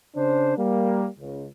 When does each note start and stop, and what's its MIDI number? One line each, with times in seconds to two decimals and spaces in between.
0.16 0.55 49
0.16 0.55 62
0.16 0.55 72
0.58 1.07 55
0.58 1.07 58
1.19 1.46 37